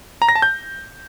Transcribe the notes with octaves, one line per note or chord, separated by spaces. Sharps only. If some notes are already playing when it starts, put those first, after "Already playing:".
A#5
A#6
A5
G6